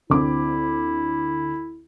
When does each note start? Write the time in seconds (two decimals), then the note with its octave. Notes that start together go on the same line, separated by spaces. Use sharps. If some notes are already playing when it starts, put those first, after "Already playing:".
0.10 D2 C4 E4 D6